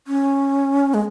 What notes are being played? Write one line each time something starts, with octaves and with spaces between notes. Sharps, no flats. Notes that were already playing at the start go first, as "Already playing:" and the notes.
C#4
G#3